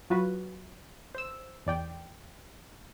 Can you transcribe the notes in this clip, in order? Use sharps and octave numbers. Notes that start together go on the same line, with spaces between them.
F#3 F4 F#4 B4
C5 E6
E2 D5 G5